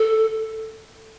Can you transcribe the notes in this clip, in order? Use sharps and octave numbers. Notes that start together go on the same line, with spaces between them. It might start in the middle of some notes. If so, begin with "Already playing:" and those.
Already playing: A4